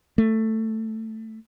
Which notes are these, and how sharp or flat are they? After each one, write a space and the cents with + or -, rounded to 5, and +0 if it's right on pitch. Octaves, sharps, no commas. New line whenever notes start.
A3 +10